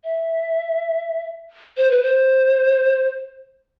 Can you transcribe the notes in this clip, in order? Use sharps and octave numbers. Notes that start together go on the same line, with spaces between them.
E5
C5
B4
C5